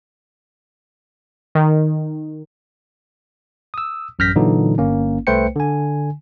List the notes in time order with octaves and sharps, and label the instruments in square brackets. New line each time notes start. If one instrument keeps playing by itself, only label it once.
[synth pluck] D#3
[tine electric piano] D#6 E6
A1 F#2 F6 G6 A#6 B6
A#2 D3 E3 F#3 D#4
G1 A#3 C#4
C2 A3 B4 C5 G5 C#7
D3 G#5